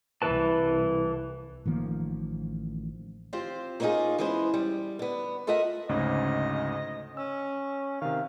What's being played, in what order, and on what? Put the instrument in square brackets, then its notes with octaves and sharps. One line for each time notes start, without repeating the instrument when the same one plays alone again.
[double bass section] C2 [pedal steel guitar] E3 B4 A5
[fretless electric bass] A1 D#3 F3 A#3
[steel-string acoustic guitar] C4 F4 G4 C5
A#3 B3 C#4 D#4 F4 G#4
E3 G#3 B3 C#4 C5
G3
D3 B3
F4 A4 A#4 D#5 E5 F#5
[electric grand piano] D2 G#2 C#3 [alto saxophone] D#5
[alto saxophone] C#4 [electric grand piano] E6
[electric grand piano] C3 D#3 [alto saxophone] F5